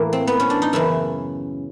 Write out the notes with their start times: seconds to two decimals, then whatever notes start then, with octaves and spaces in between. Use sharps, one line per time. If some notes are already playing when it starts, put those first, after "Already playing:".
Already playing: A2 E3 A#3
0.13 C4
0.27 B3
0.40 C#4
0.50 D4
0.62 D#4
0.73 F#2 C#3 E3 E4